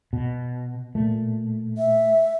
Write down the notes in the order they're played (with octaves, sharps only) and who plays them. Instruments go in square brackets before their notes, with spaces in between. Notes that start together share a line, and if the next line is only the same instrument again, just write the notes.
[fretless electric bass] B2
[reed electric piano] A#2 [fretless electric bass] A3
[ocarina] E5